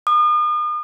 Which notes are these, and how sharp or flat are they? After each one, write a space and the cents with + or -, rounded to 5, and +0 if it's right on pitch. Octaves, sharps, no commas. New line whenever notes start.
D#6 -40